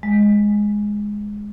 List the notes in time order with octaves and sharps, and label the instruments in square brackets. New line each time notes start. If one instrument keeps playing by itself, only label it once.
[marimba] G#3